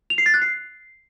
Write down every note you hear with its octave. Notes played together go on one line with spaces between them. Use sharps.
F7
C7
A6
F#6
C7